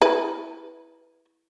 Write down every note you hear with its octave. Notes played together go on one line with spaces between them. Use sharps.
E4 B4